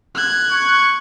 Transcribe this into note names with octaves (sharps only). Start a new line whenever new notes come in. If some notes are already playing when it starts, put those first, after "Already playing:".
F#6 G#6
C#6